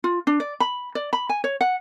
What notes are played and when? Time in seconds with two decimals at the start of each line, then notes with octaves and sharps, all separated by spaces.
0.04 F4
0.27 D4
0.40 D5
0.60 B5
0.95 D5
1.13 B5
1.29 G#5
1.44 C#5
1.61 F#5